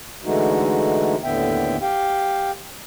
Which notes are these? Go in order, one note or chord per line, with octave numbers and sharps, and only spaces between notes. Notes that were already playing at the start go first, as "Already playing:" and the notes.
D3 E3 G#3 A3 D#4 F#4
D#2 A2 D3 B3 E5 G5
G4 F5 G5